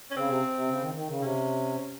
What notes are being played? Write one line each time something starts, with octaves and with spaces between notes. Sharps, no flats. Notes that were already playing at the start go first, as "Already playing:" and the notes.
C#4
C#3 C4
C3
C3
C#3
D#3
D#3
C#3
C3 C#4